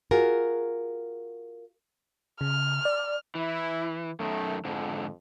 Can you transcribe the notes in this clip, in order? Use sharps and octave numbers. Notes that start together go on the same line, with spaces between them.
F4 F#4 G#4 A#4
C#3 F6
D5
E3 E4
F#2 D#3 A3
F2 G#2 D3